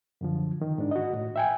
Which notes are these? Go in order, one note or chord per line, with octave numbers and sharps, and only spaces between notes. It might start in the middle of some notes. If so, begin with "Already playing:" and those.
F#2 D3 F3
D#3
G#2 D4
F#4 D#5
A2
E5 G5 G#5